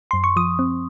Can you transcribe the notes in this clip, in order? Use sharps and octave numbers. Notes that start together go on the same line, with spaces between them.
F#2 C6
C#6
F3 D#6
C4